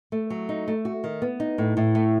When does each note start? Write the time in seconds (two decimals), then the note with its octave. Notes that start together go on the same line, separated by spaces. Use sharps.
0.12 A3
0.30 F#3
0.49 D#4
0.68 A3
0.85 F#4
1.04 D#3
1.22 B3
1.40 D#4
1.58 A2
1.77 A2
1.95 A3